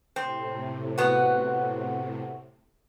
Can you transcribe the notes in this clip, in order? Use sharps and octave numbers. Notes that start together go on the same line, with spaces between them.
A2 C3 C4
B3 F#4